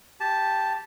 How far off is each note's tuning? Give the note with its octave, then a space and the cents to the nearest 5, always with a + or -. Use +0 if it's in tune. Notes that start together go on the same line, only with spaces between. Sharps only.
G4 +0 A5 -5